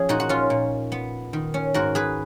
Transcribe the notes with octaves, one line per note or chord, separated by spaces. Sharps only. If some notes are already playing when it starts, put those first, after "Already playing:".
Already playing: F3 C#4 G#4
A#2 D#4 F#4
F#4
C#4 F4
A#2
B3
D#3
C#4
G#2 F#4 A#4
G#4 B4